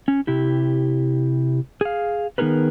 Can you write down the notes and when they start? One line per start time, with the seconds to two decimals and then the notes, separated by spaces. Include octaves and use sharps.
0.08 C#4
0.27 C3 E4 G4
1.81 G#4 F5
2.38 D#3 B3 D#4 G#4 A#4 B4